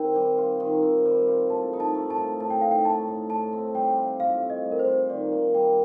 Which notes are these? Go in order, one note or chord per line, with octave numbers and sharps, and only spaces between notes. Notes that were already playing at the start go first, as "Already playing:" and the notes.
Already playing: D#3 C4 G5
G3
F4
D#3
C4
G3
F4
A2 A5
D#4
A5
A3
A5
A2
A2 A5
G5
D#4 F5
G5
A3 A5
A2
A2 A5
C4
G3 G5
F4
A2 F5
C4
D#5
G3
A#4
C5
F4
D#3 D5
A#3
G3 G5